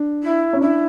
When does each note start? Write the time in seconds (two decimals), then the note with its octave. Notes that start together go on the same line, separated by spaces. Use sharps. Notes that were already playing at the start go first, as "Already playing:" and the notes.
Already playing: D4
0.22 E4
0.53 C#4
0.61 D4 E4